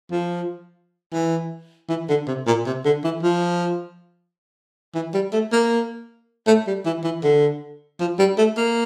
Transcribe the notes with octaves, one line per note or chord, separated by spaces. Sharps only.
F3
E3
E3
D3
C3
A#2
C3
D3
E3
F3
E3
G3
A3
A#3
A3
G3
E3
E3
D3
F3
G3
A3
A#3